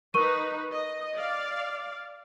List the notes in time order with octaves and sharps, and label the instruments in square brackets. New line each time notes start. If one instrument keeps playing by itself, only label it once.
[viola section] D#4 B4 [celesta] A#4 C#6 D#7
[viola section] D#5
D5 F5